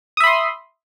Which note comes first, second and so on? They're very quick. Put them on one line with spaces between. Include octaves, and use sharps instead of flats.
D#6 E5 B5 C6